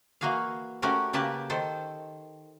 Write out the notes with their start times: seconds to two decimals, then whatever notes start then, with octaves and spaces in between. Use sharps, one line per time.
0.21 E3 A#3 F#4 G#4 F5
0.82 A3 C#4 F#4 G4 A#4
1.13 C#3 A#3 G4 B4 A5
1.50 D#3 A4 C5